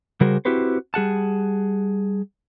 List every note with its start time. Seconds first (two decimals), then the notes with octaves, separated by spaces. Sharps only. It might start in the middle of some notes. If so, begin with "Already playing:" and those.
0.21 C#3 G3 F#4 G#4 A#4 C5
0.45 C4 E4 F#4 G4 B4 C5
0.94 G3 G#4 F#5 A5